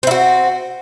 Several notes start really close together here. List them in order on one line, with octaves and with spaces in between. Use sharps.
C4 E4 F#4